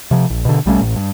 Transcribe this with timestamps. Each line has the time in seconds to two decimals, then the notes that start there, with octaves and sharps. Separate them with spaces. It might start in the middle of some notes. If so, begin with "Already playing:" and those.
0.11 C3 F3
0.30 A#1
0.45 B2 D3
0.66 B1 G3 A3 C#4
0.81 A1 A2
0.96 G2